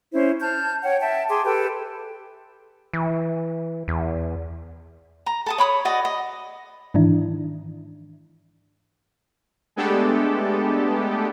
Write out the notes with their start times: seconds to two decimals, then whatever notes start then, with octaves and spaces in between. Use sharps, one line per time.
0.13 C#4 E4 C5
0.41 A5 F6 G6
0.84 C#5 F#5 G5
1.01 E5 G5 A5
1.28 G#4 G5 C6 D6
1.45 G4 A4 B4 G5
2.93 E3
3.88 E2
5.26 A#5
5.46 A4 A5 D#6
5.58 C#5 B5 D6 D#6
5.85 F#4 D5 D#5
6.05 D#5
6.94 G#2 D#3 E3 D4 E4
9.76 G#3 A3 B3 D4 G4 A4